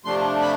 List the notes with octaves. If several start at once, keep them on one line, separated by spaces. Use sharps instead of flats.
C3 F3 A3 D4 C6
B5